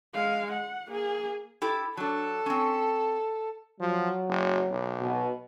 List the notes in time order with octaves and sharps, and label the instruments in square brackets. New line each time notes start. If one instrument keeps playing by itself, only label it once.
[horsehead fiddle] G#3 F5
F#5
A#3 G#4
[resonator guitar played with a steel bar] E4 G4 A4
[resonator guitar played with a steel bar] F#3 D4 [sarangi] A4
[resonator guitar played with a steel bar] C4 C#4
[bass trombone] F3 [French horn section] F#3
[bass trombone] F#1
B1
[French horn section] B2